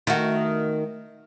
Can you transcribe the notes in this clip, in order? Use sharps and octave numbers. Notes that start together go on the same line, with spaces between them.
D#3 A3 F#4